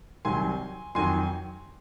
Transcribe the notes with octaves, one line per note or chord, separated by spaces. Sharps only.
C2 C3 D#3 F#3 G#5 C6
F2 D#3 F#3 G#5 C6